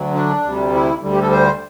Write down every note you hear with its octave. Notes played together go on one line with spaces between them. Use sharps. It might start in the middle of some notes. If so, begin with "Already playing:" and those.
Already playing: D2 D3 F#3
D4
D2 C3 G3
E4
D2 D3 G3
G4
A4
C5